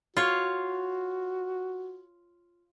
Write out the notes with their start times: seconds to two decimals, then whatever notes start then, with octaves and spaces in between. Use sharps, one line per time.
0.17 F4 F#4 C#5